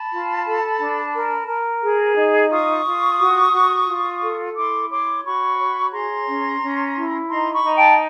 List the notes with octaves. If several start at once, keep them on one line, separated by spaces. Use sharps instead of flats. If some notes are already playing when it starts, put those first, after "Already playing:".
Already playing: A5 B5
F4
A4
D4
A#4
A#4
G#4
D#4
F4 C#6 D#6
F4
F#4
F#4
F4
A4
E4 C6 D6
C#5 C6 D6
F#4 B5 C#6
C#5
G#4 A#5 C6
C#4
C#4
E4
D#4 A#5 C6
B5 C#6
D#4
G5 A5